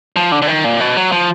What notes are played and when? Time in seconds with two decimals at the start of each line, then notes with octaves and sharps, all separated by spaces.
0.16 F3
0.32 D3
0.42 D3
0.48 D#3
0.64 A#2
0.80 B2
0.97 F#3
1.12 F3